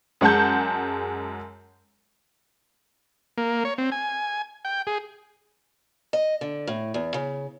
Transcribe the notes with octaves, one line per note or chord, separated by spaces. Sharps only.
F#2 G#3 F#5 A5 G6
A#3
C#5
C4
G#5
G5
G#4
D#5
D3
A2
E2
C#3